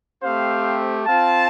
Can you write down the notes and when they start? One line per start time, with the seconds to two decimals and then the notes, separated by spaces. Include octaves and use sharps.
0.23 A3 C4 G4 C5 F5
1.06 C4 F4 F5 A5